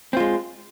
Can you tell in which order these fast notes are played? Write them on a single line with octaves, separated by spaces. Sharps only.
C4 F4 G#3